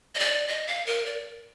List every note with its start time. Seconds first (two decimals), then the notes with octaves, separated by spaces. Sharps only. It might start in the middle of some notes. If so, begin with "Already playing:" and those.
0.15 D#5
0.19 D5
0.48 D#5
0.67 F5
0.86 A#4
1.06 D5